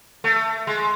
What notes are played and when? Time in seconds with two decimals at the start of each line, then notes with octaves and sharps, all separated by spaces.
0.24 A3
0.67 G#3